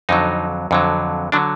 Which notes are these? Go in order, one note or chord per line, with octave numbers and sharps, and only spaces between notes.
F2 D3 F#3 D#4
F2 D3 F#3
D3 F#3 D4